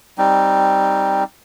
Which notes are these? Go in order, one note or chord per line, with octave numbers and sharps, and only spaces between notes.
G3 C4 D#4